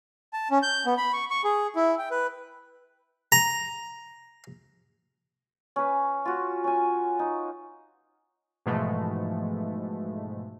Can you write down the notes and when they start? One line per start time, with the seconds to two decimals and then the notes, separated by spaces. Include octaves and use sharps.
0.33 A5
0.51 C#4
0.63 G6
0.86 B3
0.97 B5
1.13 C#6
1.30 C#6
1.44 G#4
1.76 E4
1.98 G5
2.11 B4
3.32 A#5
5.76 C#4 B4
6.25 F4 F#4
6.64 C#4 G#5
7.19 D#4
8.66 G#2 B2 E3 F3 G#3 A3